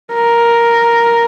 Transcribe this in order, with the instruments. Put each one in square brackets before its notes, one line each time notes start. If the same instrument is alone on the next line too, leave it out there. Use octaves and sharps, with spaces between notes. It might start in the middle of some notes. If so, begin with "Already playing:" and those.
[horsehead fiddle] A#4